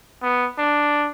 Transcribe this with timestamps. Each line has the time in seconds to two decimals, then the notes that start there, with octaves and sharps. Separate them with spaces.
0.23 B3
0.58 D4